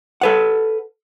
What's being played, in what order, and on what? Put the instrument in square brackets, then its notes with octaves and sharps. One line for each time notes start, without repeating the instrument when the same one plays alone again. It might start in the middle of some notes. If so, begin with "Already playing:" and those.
[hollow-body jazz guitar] A4 B4 F#5